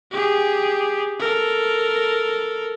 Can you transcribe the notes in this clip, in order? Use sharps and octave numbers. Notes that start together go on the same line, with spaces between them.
G4 G#4
A4 A#4